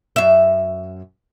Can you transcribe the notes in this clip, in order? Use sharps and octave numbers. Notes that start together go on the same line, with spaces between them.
F#2 E5